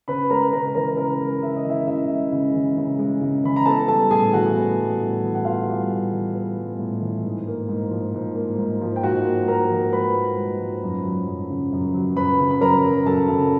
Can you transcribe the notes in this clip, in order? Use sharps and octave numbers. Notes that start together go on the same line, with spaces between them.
C#3 B4 B5
G#3 A#4 A#5
C#3 A#4 A#5
E3 A#4 A#5
C#3 A#4 A#5
G#3
C#3 E5
D#5
E3 E4 E5
C#3 E4 E5
G#3
C#3
E3
C#3
G#3
C#3
E3 B5
A#5
B3 A4 A5
G3 A4 A5
A2 G#4 G#5
E3 F#4 F#5
B3
G3
A2
E3
F#5
B3 F4 F5
G3
A2
E3
B3
G3
A2
E3
G#2
A#3
G#2
F3
G#2
A#3
G#2
F3
G5
G#2 F#4 F#5
A#3
G#2 A#4 A#5
F3
G#2 B4 B5
A#3
G#2
F3
F#2
F#3
F#2
C#3
F#2
F#3
F#2 B4 B5
C#3
B5
F#2 A#4 A#5
F#3
F#2 A4 A5
C#3